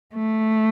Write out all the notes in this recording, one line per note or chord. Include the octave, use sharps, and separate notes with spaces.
A3